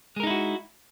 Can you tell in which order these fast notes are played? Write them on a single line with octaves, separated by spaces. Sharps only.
G#3 A#4 D#4 E4 F#4